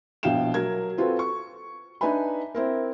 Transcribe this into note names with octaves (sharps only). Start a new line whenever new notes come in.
A#1 B2 E4 F5 G5 E7
F#3 A#4 G#6
C4 F4 F#4 A4 B4
C#6
D4 D#4 B4 E5 G#5 B5
C4 E4 A#4